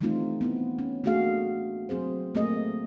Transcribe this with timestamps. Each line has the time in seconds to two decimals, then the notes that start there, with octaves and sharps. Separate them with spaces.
0.01 E3 G3 A3 C4 D#4 F4
0.41 B3 C4 E4
0.79 C#4
1.04 A3 A#3 D4 F#4 G#4 F5
1.89 F#3 C4 G#4 C5
2.35 A3 A#3 C4 G#4 D#5